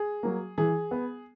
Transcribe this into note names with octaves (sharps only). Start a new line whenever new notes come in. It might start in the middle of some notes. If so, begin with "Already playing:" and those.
Already playing: G#4
F#3 A#3
E3 G#4
B3